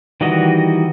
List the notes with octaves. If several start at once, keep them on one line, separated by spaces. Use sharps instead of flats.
D#3 E3 G3 F#4 D#5